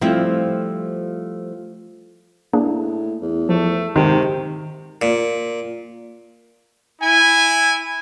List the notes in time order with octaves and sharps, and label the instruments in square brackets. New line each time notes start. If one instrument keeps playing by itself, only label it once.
[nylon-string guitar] F3 G3 A3 C4 E4 F4
[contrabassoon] A2 [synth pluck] A#3 D4 G#4
[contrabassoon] E2
[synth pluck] F3 [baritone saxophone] A3
[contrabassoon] G#2 [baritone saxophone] C3 [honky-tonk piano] D#3
[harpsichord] A#2
[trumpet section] E4 G#5